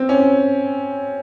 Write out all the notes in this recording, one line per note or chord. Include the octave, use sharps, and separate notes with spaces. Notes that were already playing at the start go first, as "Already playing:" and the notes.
Already playing: C4
C#4